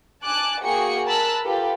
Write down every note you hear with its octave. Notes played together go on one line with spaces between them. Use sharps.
G#5 A5 D6 F#6
A#3 F#4 G#4 G5 C#7
A#4 A5 B5 E6 F#6
F4 G4 A4 B4